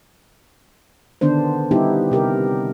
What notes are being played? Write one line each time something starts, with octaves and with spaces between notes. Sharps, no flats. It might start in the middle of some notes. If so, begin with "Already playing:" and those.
D3 D#3 B3 D4 C5
G3 B3 D#4 E4 G4
C3 G4 A#4